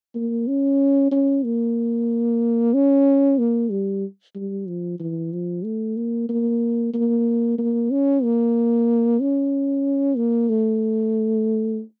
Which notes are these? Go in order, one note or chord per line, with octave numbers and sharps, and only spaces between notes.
A#3
C#4
C#4
A#3
C#4
A#3
G3
G3
F3
E3
F3
A3
A#3
A#3
A#3
A#3
C#4
A#3
C#4
A#3
A3